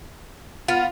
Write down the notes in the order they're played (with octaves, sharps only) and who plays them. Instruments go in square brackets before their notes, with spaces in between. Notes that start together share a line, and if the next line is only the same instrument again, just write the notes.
[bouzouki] B3 [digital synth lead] F4